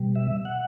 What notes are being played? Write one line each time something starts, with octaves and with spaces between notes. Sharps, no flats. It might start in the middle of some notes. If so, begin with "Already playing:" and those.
Already playing: B2 G3
E5
F#5